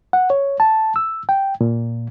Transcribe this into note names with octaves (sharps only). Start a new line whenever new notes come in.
F#5
C#5
A5
E6
G5
A#2